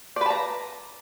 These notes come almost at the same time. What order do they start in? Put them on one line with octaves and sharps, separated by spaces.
D5 B4 A5 A#5